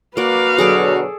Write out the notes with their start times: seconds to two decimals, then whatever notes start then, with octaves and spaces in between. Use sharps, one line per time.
0.17 A#3 F#4 B4 D5 F5
0.58 B2 D3 F#3 G#4 A4 D5